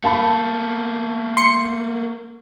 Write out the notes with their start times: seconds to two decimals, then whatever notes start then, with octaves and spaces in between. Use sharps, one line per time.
0.04 A3 A#3 F5 A5 B5
1.37 C6 C#7